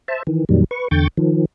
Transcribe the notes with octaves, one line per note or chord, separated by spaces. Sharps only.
C5 E5 A5
D#3 E3
F2 A#2 D#3 F#3 G3
B4 C#6
E2 D3 G5 C#6 G6 A6
D#3 F3